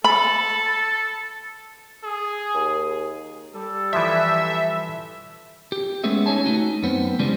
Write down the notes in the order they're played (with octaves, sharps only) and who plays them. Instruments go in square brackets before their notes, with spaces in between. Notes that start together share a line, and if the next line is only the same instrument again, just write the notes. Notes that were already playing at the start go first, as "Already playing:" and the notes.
[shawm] A4 [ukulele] B5
[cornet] G#4
[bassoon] D#2
[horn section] G3 A4
[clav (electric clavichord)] E3 F3 [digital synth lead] E5
[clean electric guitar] G4
G#3 A3 B3 C#4 G#4 E5
C#4 D#4 C#5 G#5 A5
A3 A#3 D#4 F#4
F#2 B3 C4
C#3 E3 G3 G#3 C4 D4